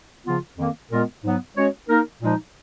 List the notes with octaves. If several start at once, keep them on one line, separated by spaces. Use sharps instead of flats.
C#3 F3 B3 F4
F2 D#3 A#3
A#2 G#3 B3 F4 A#4
G#2 F#3 B3
G#3 C#4 F#4 C#5
A#3 D#4 A#4
A#2 F3 G#3 D#4